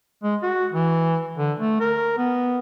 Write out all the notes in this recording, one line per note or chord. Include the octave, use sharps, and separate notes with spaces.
G#3
F#4
E3
D3
A3
A#4
B3